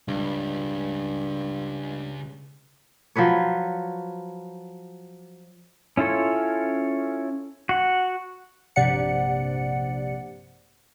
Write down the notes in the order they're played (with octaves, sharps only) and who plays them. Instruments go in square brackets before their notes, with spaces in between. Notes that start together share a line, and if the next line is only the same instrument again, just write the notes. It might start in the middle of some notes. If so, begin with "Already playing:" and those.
[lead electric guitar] C#2 [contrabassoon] G2
[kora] F3 F#3 B4 C#5
[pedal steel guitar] C#4 E4 F4 A4 C#5
F#4 F#5
[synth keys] A#1 G2 C3 D5 F#5 C#7